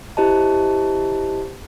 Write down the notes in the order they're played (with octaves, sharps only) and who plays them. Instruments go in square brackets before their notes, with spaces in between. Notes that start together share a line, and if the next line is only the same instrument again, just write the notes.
[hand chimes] E4 G4 C5 D#5 A5